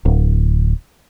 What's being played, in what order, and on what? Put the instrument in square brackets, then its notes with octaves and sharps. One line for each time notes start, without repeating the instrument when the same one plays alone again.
[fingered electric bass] D1